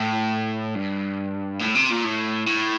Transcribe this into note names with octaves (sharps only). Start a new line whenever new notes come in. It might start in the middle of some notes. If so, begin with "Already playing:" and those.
Already playing: A2
G2
A2
C3
A#2
A2
A2